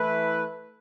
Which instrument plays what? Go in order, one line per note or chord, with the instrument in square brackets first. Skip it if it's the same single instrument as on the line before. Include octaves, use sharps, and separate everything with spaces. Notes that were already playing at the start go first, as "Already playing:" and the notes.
Already playing: [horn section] E3 A3 E4 B4